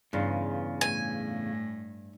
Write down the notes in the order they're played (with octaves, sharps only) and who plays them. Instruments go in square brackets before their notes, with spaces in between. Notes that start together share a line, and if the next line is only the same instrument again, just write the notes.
[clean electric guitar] E2 C#3 F4 [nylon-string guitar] G2
[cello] A2 [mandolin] G#5